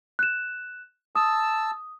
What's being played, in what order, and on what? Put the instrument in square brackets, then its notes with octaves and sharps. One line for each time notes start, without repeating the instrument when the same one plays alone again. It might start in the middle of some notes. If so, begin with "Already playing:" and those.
[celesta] F#6 E7
[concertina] A5 E6 [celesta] D#6